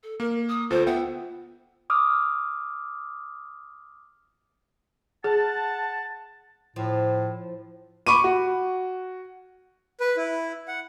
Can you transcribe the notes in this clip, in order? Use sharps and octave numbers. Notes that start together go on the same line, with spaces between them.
A4
A#3 A#4
D#6
D2 F4 A4 C5
B3 E5 F#5 G5
D6 D#6 F6
G#4 F#5 A5
A2 F3
B5 C#6 D6 D#7
F#4
B4
E4
F#5